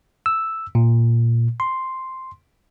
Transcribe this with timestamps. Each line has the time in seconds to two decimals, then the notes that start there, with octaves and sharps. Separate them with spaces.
0.26 E6
0.75 A#2
1.60 C6